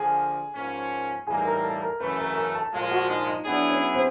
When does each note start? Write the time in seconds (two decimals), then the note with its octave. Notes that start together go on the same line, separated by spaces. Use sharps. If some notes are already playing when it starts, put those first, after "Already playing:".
Already playing: D3 F3 A#3 G#4 G#5
0.54 G#2 F3 A#3 C#4
1.27 A2 E3 G3 A#3 D#4 G#4 G#5
1.45 A#4 A#5
1.64 A4 A5
1.82 A#4 A#5
2.00 F#2 C#3 E3 A3 B4 B5
2.19 A#4 A#5
2.36 A#4 A#5
2.55 A4 A5
2.73 A#2 F3 G#3 F4 F5
2.91 F#4 F#5
3.10 D#4 D#5
3.27 D#4 D#5
3.46 F#3 B3 D4 E4 G#4 D5
3.70 C#4 C#5
3.95 C4 C5